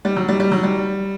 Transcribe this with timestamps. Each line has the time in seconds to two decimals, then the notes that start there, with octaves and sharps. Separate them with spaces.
0.05 G3
0.16 F#3
0.29 G3
0.40 G3
0.52 F#3
0.63 G3